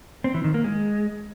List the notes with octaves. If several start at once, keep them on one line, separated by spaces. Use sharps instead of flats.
C4
E3
D#3
A#3
G#3